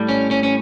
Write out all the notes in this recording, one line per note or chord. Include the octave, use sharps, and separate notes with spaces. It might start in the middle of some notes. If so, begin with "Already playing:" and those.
Already playing: A2 G3
C#4
C#4
C#4